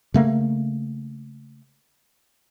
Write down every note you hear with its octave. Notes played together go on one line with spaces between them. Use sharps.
C#3 A3 A#3